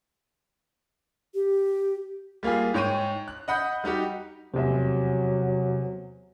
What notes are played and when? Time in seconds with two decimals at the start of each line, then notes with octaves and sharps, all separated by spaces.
1.34 G4
2.43 G3 A#3 F4 G#4
2.74 G#2 C#5 G5 C#6 D#7
3.28 F#6
3.48 D#5 F#5 B5 G6
3.84 G3 D#4 F#4 G4
4.54 F1 E2 C3 F#3 C5 E5